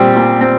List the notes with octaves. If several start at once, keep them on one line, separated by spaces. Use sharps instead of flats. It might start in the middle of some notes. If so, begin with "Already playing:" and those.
Already playing: A#2 G3 C4
A#2
C4